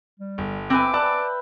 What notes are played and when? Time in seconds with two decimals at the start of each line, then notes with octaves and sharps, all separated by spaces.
0.20 G3
0.38 G1
0.70 C4 B4 E5 G5 G#5 D6
0.93 B4 D5 A5 F#6